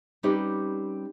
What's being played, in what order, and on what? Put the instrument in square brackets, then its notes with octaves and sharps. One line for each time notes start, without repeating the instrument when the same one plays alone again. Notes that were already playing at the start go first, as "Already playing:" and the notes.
[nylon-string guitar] G3 C4 C#4 D#4 G4 B4